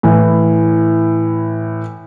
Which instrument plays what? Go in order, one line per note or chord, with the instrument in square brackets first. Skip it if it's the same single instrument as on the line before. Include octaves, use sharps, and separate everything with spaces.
[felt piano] A2 E3